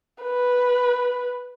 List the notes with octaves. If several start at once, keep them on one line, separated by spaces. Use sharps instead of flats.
B4